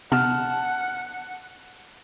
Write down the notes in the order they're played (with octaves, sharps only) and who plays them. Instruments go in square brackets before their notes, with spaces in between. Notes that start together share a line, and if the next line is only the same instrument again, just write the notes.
[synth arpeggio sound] C3 B3 [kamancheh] F#5 [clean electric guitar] A5 [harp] F6